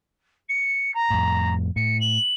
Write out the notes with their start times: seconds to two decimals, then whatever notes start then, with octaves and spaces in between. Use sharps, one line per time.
0.49 C#7
0.94 A#5
1.10 F2 A2
1.76 A2 C#7
2.00 F#7